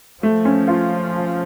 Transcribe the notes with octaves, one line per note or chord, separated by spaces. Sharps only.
F3 A3
C#4
F4